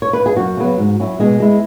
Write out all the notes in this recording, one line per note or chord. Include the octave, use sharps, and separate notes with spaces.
C#5
B4
G#4
F#2 F#4
C#3 F#3 B3
G#2
F#3 C#4 E4
B2 G#3 G#4
G#3 E4